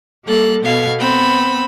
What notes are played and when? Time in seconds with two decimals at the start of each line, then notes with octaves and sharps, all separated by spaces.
0.24 G3 A#3 A4 F#6
0.63 B2 B3 A4 F5 G#6
0.98 B3 C4 B5 E6